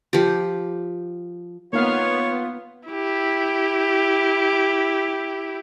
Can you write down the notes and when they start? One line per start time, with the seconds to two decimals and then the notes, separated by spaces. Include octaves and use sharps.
0.13 F3 G4
1.73 A#3 B3 D#4 F4 C#5 F5
2.88 E4 G4